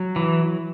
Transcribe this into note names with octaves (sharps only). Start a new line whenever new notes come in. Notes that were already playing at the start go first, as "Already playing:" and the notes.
Already playing: F#3
E3